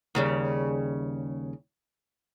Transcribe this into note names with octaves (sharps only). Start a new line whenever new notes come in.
D#2 C#3 G3